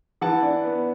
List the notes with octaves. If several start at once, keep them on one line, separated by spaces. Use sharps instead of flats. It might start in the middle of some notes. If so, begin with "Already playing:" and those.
E3 F#5 A5
D4
B3